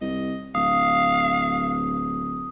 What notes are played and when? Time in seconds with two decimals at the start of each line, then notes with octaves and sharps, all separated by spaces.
0.01 C2 D#5
0.55 D1 F5 D#6